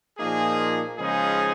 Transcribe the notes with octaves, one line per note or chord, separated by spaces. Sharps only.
A#2 F3 A#3 D#4 G#4
C#3 F3 G#3 D#4 G#4